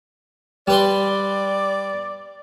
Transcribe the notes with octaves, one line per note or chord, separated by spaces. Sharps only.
G3 B4 D5 C6